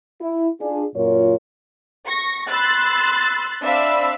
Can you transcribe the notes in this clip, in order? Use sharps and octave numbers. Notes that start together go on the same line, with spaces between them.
E4
D4 F4 G#4
F#2 A#2 F4 A#4 C#5
C#6 A#6
B5 C6 E6 F#6 A6
C4 D4 E5 F5 B5 E6